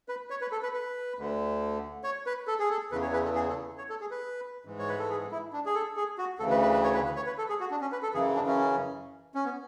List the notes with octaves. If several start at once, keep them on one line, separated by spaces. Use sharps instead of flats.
B4
C#5
B4
A4
B4
B4
D2 D3
C#5
B4
A4
G#4
A4
E2 C#3 E3 B4
C#5
B4
A4
G#4
A4
C#5
A4
G#4
B4
G#2 E3
C#5
B4
A4
G#4
E4
D4
G#4
A4
G#4
F#4
D2 C#3 E3 A4
B4
B4
B4
C#5
B4
B4
C#5
B4
A4
G#4
F#4
D4
C#4
B4
A4
F#2 C#3 E3 G#4
D4
C#4
C#4
B3